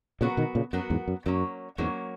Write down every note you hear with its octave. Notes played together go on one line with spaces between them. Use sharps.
A#2 C#3 F#3 B3 F#4 A#4
B2 D#3
A#2 C#3
F#2 F#3 B3 F#4 A#4
E2 G#2
F#2
F#2 F#3 A#3 C#4
E2 G#2 F#3 A#3 C#4